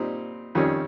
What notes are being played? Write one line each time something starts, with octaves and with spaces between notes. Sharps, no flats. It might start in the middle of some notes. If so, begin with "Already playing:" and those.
Already playing: A#2 G3 C4 D#4
F2 D#3 G3 C#4